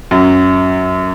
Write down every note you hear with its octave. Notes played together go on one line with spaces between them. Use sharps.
F#2 F#3